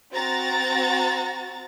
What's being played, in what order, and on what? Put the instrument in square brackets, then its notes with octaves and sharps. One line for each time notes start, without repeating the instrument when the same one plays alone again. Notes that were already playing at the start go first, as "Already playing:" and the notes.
[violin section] C4 F#4 A#5 A6